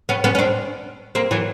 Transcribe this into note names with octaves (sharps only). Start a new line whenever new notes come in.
B3 C#4
B3 C#4
C#4
C4 D4
A#3 C4
E3 F#3